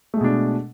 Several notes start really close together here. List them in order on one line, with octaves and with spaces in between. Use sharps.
A3 G#3 B2 D4